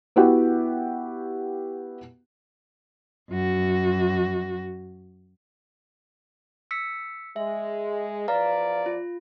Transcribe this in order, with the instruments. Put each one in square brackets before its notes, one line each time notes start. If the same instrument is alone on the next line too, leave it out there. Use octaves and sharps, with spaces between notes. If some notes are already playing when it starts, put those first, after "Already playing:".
[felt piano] B3 E4 F#4 G4 F#5
[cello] F#2 F#4
[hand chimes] E6 B6 C#7
[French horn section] G#3 [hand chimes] E5
[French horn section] E2 F3 D5 [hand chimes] B4 F5 A#5
[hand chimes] F4